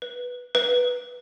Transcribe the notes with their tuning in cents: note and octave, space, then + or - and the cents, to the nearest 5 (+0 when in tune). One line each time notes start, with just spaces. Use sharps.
B4 -5
B4 -5